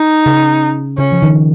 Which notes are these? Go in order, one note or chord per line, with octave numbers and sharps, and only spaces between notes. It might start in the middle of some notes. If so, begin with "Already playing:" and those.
Already playing: D#4
C#3
C#3 C#4
F3
D#3